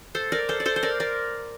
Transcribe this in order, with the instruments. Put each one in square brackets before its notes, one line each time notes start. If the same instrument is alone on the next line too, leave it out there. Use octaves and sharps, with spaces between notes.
[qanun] A4 C5
A#4 D5
A4 C5
D5
A4 C5
C5
A#4 D5
A#4 D5